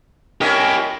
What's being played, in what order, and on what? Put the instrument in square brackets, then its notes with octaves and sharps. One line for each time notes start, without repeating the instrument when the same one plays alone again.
[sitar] C#4 A#4 D#5 [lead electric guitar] E4 G4